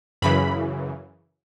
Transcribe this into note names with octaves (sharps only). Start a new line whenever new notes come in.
F#2 C#3 E3 B5